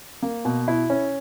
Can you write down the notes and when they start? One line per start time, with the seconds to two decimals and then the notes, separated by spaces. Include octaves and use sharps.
0.23 A#3
0.45 B2
0.68 E4
0.90 C#4